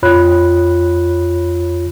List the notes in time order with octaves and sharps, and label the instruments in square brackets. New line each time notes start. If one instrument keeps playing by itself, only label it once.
[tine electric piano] F2 F4 C#5 B5 F#6